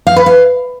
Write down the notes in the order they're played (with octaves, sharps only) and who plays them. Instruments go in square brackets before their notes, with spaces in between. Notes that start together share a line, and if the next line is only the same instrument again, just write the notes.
[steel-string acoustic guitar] F5
B4
F5